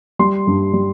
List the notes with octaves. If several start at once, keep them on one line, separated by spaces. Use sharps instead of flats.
G3 C6
G2
G3